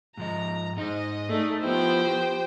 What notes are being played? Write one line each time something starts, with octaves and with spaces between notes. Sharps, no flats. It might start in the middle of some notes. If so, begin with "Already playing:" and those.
G#2 F3 D#5 A#5
G#2 D#4 C5 D#5
A3 D#4 G#4 D5
F3 B3 E4 G4 C5 G5
G4